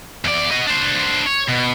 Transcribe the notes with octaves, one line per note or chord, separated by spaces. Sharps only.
E2 D5
F#4 D#5
D4 C5
C#5
B2